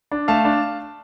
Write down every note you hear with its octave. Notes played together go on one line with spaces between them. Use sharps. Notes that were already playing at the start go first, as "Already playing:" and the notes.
D4
A3 F5 A5
D4